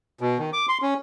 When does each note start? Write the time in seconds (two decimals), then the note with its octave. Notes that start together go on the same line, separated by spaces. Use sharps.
0.21 B2
0.39 D#3
0.53 D6
0.69 C6
0.82 C#4